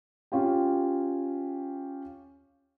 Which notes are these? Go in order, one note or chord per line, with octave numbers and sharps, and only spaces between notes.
C#4 F4 G4